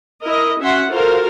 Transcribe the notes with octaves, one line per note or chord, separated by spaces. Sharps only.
E4 A#4 D#5
C#4 F#4 E5 F#5 C6
F4 F#4 A4 A#4 C5 F5